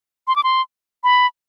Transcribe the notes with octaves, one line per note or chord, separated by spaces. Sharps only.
C6
D6
C6
B5